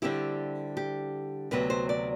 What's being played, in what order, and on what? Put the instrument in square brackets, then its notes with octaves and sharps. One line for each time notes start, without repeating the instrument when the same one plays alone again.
[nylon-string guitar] D3 G3 C4 E4 G4
G4
D2 C3 F#3 B3 B4
C5
D5